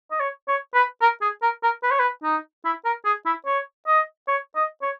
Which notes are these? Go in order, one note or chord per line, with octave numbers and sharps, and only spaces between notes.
D#5
C#5
C#5
B4
A#4
G#4
A#4
A#4
B4
C#5
B4
D#4
E4
A#4
G#4
E4
C#5
D#5
C#5
D#5
C#5